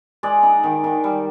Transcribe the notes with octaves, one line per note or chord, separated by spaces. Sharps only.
G#3 D5
D#4
D#3
D#3
G3